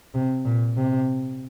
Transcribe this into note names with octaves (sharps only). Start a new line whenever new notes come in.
C3
A#2
C3